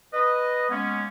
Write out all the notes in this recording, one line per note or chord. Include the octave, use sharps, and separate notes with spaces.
B4 D#5
G#3 A#3 B3 C#4